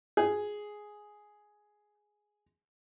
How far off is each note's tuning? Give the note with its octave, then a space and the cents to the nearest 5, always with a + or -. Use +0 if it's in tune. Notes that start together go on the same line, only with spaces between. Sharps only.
G#4 +5